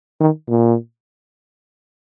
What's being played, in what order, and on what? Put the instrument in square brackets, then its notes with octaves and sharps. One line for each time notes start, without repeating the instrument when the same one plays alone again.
[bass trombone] D#3
A#2